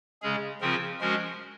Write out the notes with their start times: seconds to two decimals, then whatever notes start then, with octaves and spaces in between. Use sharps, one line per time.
0.22 C#3 G#3 C#4 G#4
0.61 C#3 F3 C4 F4 A#4
1.01 F3 G#3 C#4 F#4 A#4